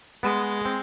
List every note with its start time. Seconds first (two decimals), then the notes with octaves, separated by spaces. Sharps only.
0.23 G#3 B3
0.65 C4